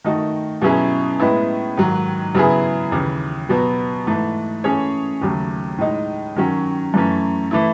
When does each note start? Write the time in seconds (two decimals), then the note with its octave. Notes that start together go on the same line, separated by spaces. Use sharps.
0.04 D#3 A3 D#4 F#4
0.62 B2 F#3 C#4 E4 G#4
1.20 A2 G#3 B3 E4
1.77 G#2 D#3 F#3
2.34 C#3 F#3 B3 E4 G#4
2.92 D#2 C#3 E3
3.49 B2 F#3 B3 F#4
4.06 G#2 E3 A3
4.64 E3 A3 C#4 G#4 C#5
5.22 D#2 C#3 F#3 A3
5.78 A2 G#3 D#4
6.36 D#3 F#3 C#4 F#4
6.94 F#2 E3 A3 C#4
7.51 E3 A3 E4